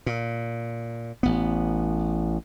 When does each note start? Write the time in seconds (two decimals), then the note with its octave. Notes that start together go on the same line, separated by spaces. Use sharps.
0.06 A#2
1.23 A1 B3